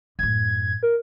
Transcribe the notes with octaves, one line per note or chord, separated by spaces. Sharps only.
F#2 A2 G#6
A#4